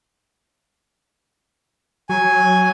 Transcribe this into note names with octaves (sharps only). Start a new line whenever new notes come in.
F#3 G#5